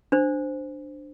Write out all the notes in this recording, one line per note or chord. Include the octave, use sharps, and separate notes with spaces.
D4 C5